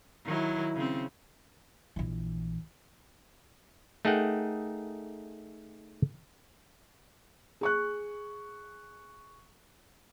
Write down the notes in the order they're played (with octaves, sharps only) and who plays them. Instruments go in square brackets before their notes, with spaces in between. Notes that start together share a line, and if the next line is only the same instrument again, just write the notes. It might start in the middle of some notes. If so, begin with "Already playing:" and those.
[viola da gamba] D#3 F#3 E4
C#3 C4
[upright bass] A#1 E3
[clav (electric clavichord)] A3 D#4 G#4 A#4 F#5 G5
[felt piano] G#4 C#6 F#6